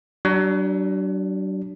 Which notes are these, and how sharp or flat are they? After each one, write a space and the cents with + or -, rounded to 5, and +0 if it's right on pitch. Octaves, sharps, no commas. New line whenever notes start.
F#3 +45 D4 +0